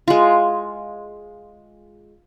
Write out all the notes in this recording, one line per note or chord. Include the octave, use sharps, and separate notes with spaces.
G#3 F4